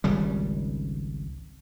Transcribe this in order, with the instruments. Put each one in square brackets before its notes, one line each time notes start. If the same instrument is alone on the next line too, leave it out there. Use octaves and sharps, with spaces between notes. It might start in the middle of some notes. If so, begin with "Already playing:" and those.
[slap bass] G#1 C#2 C#3 G3